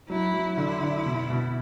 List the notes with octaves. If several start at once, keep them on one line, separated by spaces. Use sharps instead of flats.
F#3 E4
F#3
D3 E4
D3
B2
B2